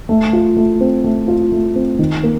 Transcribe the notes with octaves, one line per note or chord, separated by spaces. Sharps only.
A3
F4
A3
C4
A3
F4
A3
C4
D#3
A#3